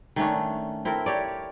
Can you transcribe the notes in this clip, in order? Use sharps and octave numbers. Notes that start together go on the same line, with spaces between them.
D#3 A3 C#4 D4
C4 E4 A4 A#4
G4 C#5 D5